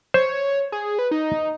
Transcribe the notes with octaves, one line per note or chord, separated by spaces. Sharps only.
C5 C#5
G#4
B4
D#4